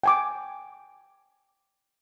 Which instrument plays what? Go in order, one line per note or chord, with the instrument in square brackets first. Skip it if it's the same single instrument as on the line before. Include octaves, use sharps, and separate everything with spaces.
[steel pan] G5 G#5 D6